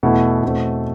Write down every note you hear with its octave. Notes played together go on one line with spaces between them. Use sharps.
E2 B2 A3 E4
E2 B2 A3 C4